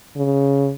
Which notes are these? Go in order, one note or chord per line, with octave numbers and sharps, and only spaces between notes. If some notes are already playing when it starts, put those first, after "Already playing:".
C#3